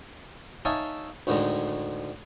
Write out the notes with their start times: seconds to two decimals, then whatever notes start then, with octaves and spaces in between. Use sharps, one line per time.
0.65 D#4 C#5 E5 F5 G#5 A5
1.27 D2 A2 D3 D#3 G#3